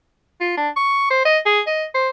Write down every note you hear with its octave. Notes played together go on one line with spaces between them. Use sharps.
F4
D4
C#6
C5
D#5
G#4
D#5
C5